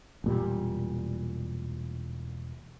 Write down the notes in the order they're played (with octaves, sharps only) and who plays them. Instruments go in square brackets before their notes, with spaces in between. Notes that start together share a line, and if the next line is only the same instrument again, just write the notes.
[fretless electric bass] E1 A#2 G3